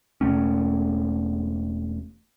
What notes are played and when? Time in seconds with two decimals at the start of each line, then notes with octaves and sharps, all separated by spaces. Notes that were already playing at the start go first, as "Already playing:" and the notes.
0.21 E1 A2 A3 C#4